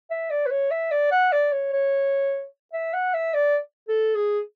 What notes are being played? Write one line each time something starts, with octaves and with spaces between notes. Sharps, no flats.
E5
D5
B4
C#5
E5
D5
F#5
D5
C#5
C#5
E5
F#5
E5
D5
A4
G#4